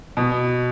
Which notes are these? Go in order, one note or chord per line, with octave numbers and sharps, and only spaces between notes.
B2